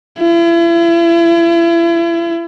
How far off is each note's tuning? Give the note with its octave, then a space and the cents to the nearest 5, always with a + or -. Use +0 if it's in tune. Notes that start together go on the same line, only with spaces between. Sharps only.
E4 +40